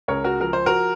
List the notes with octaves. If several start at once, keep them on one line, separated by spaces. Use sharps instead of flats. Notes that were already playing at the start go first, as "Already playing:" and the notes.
C#2 A#4 C#5
F#4 A#4
F3 A#4
C5
F#4 A#4